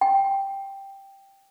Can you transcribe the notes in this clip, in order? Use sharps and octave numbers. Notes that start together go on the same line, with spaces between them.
G5